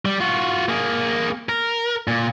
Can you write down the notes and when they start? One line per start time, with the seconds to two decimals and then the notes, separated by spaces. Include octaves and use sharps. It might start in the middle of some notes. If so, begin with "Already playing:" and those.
0.05 G3
0.20 F4 F#4
0.69 A#3 G#4
1.49 A#4
2.08 A#2